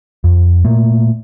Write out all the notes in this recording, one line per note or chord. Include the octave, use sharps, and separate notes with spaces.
F2
A#2 A3 A#3